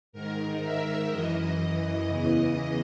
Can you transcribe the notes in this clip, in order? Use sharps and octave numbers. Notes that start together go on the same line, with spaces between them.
G#2 D#3 A#4
E5
F#2 E3 D#5
E2 C#3 E3 D#5